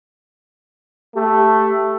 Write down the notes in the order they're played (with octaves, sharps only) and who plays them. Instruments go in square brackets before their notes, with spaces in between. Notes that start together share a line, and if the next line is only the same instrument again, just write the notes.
[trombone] A3 [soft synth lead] G4